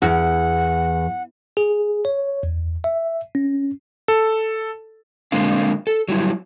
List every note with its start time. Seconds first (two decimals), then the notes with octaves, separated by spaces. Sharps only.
0.02 E2 F#5
1.57 G#4
2.05 C#5
2.43 E2
2.84 E5
3.35 C#4
4.08 A4
5.32 D3 G#3 A#3 C4 D4 F5
5.87 A4
6.08 F#3 G3 E4